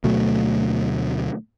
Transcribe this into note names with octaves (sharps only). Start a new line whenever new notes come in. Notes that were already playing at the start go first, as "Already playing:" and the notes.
D2 B2 F#3 A3